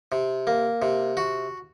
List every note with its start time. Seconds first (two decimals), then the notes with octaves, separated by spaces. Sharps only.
0.12 C3
0.47 A#3
0.82 C3
1.17 F#4